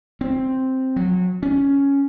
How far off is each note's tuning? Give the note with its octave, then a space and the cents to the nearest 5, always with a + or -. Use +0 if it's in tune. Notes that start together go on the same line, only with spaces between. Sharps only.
C4 +0
F#3 -25
C#4 +5